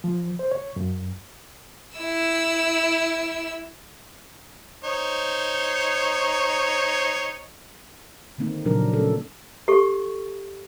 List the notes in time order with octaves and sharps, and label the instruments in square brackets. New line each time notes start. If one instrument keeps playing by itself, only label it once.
[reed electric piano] F3
C5
C#5
F#2
[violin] E4 E6
[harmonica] D#4 C5 C#5
[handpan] D3 D#3 A#3 C4 D#4
A#2 C#3 F3 F#3 D4 A#4
C#4 A4
[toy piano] G4 A4 C#6